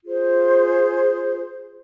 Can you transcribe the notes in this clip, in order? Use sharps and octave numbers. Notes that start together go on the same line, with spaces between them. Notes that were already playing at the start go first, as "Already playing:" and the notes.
F4 G#4 C5